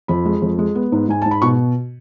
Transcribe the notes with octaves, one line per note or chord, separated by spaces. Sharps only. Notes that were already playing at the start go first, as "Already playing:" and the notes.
F2 B5
G#3
F2
G#3
B3
G#2
G#2 G#5
G#2 A5
B5
B2 C#6